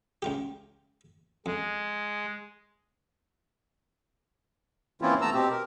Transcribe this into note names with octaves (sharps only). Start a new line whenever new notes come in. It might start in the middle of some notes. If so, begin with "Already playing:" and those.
C#2 F4 G4
F2 G#3
E3 A#3 C4 C#4 E4 F4
A3 B3 A5 A#5 E6
B2 C4 G4
A#4